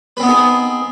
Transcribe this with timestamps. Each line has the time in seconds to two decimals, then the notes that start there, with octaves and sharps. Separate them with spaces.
0.17 B4
0.20 C4
0.23 B3
0.26 D#4
0.29 G#4